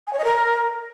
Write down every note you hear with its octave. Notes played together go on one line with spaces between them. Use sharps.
G#5
C#5
D#5
A#4